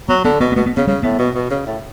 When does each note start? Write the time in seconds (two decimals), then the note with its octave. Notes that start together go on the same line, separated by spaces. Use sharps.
0.09 F#3 B3
0.25 D3 B3
0.40 B2 B3
0.52 B3
0.56 B2 A3
0.66 B3
0.77 C#3 B3
0.87 C#3 G3
1.03 A2 B3
1.19 B2
1.35 B2
1.51 C#3
1.66 A2